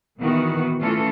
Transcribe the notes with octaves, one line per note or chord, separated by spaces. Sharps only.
A#2 D#3 E3 B3 F#4
E3 A3 C#4 F4 A4